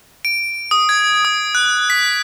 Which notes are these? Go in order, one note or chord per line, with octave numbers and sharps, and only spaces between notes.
D7
D#6
G#6
D#6
F#6
B6